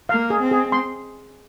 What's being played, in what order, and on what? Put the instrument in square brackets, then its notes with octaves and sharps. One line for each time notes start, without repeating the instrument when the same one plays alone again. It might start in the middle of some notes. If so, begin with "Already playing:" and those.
[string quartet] A#3 [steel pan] F5
[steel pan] G#4
[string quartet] C4
[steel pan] G#4
C6